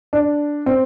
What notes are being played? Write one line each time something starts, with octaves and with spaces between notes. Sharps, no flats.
D4
C4